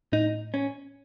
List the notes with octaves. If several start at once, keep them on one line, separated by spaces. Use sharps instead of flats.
A2 D#4
C#4